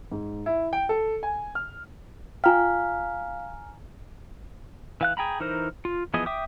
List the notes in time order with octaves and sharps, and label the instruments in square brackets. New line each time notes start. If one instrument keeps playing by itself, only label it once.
[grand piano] G#2
E4
G5
A4
G#5
F6
[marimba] F4 G5 [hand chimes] F5 [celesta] G#5 A#5 F6
[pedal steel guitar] E3 F5 F#6
G#4 G5 A#5 B5
E3 D#4 A#4 C5
F4
E3 F3 B3 G#4 D#5
E5 G5 D6 D#6